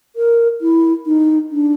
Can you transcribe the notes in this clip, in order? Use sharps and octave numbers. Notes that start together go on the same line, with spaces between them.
A#4
E4
D#4
D4